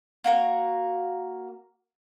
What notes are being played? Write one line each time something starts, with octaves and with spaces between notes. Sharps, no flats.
A#3 F#4 A#4